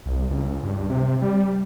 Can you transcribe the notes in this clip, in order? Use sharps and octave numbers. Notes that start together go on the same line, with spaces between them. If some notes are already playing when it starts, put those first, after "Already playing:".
C2
C#2
C#2
G2
C3
G3